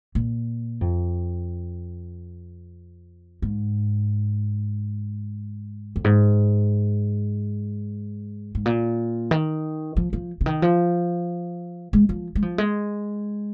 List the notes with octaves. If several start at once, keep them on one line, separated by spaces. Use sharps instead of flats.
A#2
F2
G#2
F2
G#2
G#2
A#2
D#3
F3
F3
C#3
D#3
F3
G#3
F3
G#3
F3
G#3